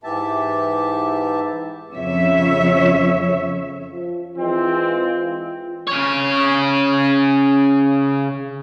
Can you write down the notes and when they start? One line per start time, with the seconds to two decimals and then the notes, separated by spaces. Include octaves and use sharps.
0.03 G#2 E3 G4 E5 A5
1.93 F2 C#3 F3 C#5 E5
3.91 F3
4.37 E3 G#3 C4 F4
5.87 C#3 C#5